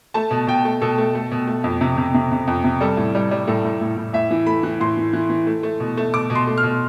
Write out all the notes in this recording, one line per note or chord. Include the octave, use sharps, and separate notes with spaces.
A3 A5
B2
B2 G5
A3
B2 A4
A3
A3
B2
A3
F2
C3
C3
C3
C3
F2
C3
G3 A4
A2
G3
G3
A2 A4
A2
A2
A2
A2 E5
E3
A3 B5
E3
A2 C6
E3
E3
E3
A3
A3
B2
A3
B2 D6
B2
C6
A3
F6
B2